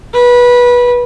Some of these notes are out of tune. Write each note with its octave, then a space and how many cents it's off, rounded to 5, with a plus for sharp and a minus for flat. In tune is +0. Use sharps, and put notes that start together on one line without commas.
B4 -20